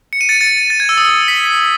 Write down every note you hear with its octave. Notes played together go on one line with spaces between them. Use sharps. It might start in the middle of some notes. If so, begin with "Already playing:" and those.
C#7
D#7
A6 C#7
A6 C#7
A6
G#6
E6
D#6
E6
B6